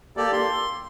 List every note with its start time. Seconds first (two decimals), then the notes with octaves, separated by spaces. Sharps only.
0.17 A#3 G4 A4 D5
0.33 C6